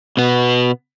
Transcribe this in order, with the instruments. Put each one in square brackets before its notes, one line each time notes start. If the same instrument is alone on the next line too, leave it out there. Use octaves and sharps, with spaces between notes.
[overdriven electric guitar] B2 B3